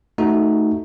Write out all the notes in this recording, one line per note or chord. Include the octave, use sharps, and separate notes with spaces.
A3 D#4 F#4